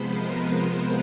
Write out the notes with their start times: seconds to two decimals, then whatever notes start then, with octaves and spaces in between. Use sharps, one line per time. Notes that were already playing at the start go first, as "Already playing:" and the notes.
Already playing: C3 F3 G#3 B3 B4 C5
0.13 A#4